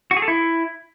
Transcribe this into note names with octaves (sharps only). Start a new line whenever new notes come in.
F#4
G#4
A4
E4